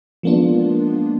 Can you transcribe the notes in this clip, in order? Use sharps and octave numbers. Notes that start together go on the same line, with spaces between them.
F3 G#3 A#3 B3 D4 F4